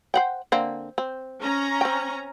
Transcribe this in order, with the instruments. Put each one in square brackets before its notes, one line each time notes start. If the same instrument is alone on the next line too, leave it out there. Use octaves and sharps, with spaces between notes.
[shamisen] C5 F#5 G5
D3 A#3 C4
C4
[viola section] C#4 A#5
[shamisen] C4 G5